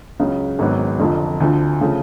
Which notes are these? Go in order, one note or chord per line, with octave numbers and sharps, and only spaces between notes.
C#2 C#3 F#3
G#1 G#2 F#3 B3
F1 F2 D3 F3
D2 D3 F3
C#3 F3 A3